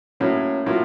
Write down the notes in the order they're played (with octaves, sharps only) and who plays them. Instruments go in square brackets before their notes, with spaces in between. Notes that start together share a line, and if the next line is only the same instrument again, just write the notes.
[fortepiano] A2 F#3 A#3 [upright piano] C#4
[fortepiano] A2 F#3 A#3 [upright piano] F4